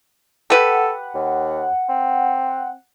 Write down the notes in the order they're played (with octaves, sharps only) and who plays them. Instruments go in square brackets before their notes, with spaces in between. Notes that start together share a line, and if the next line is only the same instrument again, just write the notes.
[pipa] G4 B4 [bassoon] A4 [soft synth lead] F#5
[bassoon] D#2
C4